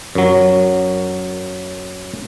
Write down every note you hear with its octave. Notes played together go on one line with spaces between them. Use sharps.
F#2 F#3